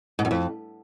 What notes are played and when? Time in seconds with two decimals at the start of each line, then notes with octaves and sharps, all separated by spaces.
0.19 G#2
0.25 F#2
0.31 F2